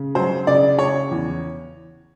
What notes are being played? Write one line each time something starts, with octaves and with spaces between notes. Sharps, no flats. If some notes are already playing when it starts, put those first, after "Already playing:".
Already playing: C#3
F#3 C5
C#3 D5
C#3 C#5
E2